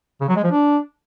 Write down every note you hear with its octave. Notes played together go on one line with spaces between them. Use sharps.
C#3
F#3
G#3
F3
D4